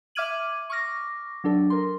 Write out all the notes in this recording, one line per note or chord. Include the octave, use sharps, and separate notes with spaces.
E5 D6 F6 G#6 D#7 F#7
C#6 D6 F6 A#6
F#3 D4 A4
A#4 C6